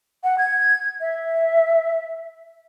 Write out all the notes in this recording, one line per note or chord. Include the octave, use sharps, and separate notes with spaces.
F#5
G#6
E5